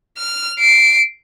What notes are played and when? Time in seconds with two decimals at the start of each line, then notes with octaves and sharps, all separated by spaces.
0.17 F6
0.59 C7 D7